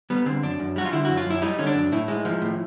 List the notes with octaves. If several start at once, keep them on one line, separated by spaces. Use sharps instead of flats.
G3 B3
D3 C4
F#2 D4
F#2
G3 F#4
F4
D3 E4
F#2 F#4
F4
F#2 E4
G3 D#4
D3 C#4
D4
F#2
A2 E4
G#3
F3
A2